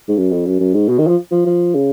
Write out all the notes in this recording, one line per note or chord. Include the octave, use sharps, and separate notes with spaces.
G#2
F#2
F2
F#2
F#2
G#2
B2
D#3
F3
F3
F3
C#3